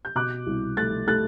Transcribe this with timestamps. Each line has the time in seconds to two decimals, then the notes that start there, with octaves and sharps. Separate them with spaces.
0.05 G6
0.15 B2 D6 F#6
0.46 C2
0.77 A3 F#6 A6
1.08 A3 F#6 A6